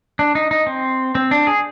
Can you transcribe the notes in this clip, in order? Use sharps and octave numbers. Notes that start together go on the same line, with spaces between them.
D4
D#4
D#4
C4
C4
D4
G#4